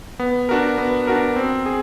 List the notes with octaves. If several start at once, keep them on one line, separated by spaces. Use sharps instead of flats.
B3
D4 F#4 A#4
B3
D4 F#4 A#4
C4
G#4